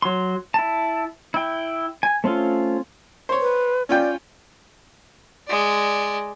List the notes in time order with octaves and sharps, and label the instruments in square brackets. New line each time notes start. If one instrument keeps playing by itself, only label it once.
[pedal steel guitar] F#3 C6
E4 A5
E4 G5
G#5
A3 C4 C#4 F4
[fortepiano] C5 C#5
[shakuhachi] B4
[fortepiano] C#4 F4 G5 [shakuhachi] D5
[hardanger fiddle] G#3 D5